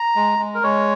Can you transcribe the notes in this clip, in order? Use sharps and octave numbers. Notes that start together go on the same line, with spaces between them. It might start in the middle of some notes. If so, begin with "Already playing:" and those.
Already playing: A#5
G#3
G#3
A#4
G#3 C#5